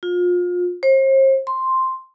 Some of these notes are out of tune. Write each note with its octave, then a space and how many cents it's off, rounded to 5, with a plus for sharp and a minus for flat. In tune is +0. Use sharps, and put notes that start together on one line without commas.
F4 +30
C5 +40
C6 +0